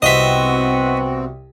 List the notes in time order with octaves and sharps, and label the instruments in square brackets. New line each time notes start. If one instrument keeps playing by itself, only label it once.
[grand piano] C2 [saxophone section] B3 F#4 [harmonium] C4 [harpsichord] D#5 E5